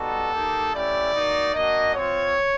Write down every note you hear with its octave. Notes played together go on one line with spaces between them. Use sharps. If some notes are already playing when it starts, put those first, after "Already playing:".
Already playing: G3 B3 D#4 F#4 A4
A#3 D#4 G4
A3 C#4 E4 G4 D5
A#3 D#4 F#4
A#3 D4 F#4 D#5
C4 F4 C#5